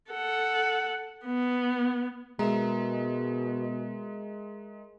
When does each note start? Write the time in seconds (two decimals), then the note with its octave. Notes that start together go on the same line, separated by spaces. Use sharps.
0.11 A4 F#5
1.25 B3
2.39 B2 G#3 A#4 E5 A#5